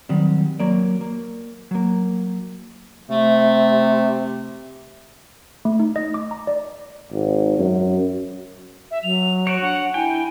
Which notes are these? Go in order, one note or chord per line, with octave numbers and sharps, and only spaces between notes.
D#3 F#3 G3 C4
F#3 A#3 D5
A#3
F#3 A#3
C3 A3
A3
D#4
D#5
D6
A#5
D5
G#1
F#2
E5
F#3 F7
F#4 C#5 D7
D4 F#5
E4 G5 G#5